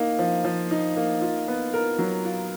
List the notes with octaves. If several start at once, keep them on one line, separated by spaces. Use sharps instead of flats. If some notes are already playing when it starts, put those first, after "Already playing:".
Already playing: A#3 D#4
F3
F3
D#4
A#3
F4
B3
A#4
F#3
F4